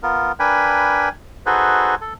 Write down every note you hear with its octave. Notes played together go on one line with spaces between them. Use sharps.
B3 F4 A#4
D4 A#4 B4 G5 G#5 B5
D#4 F#4 G#4 A4 B4 C5
A4